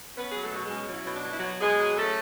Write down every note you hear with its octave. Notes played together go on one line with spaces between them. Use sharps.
B3 C#4 B4
F#3 G#4
A3 A4
B2 F#4
G#3 G#4
C#4
F#3 E4
B2
D4
F#3
E4
B2 F#3 F#4
B2 G#3 G#4
F#3
A3 C#4 A4